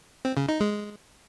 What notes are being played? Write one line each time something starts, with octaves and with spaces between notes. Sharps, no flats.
C4
C#3
D#4
G#3